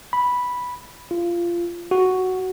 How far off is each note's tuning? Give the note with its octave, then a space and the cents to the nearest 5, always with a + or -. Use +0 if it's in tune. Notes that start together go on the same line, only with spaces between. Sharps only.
B5 -5
F4 -20
F#4 +5